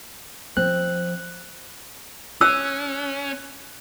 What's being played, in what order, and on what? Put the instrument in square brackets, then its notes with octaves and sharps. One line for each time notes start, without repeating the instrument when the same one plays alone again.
[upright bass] F3 [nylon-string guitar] C4 [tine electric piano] F#6
[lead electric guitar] C#4 [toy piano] E6 [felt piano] F#6